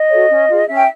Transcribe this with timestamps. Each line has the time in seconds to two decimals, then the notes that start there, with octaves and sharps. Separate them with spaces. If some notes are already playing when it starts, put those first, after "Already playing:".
Already playing: D#5
0.10 F#4 A4 C#5
0.29 C#4
0.48 F4 G#4
0.67 C#4 E5
0.77 G5